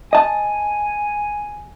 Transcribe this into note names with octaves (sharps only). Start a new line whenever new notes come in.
D#5 G#5 A5